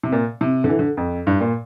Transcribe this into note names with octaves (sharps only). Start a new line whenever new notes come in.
C3
A#2
C3
D3
E3
D3
F2
G2
A#2